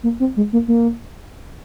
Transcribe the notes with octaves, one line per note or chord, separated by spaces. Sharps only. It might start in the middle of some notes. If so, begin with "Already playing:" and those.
A#3
C4
G#3
A#3
A#3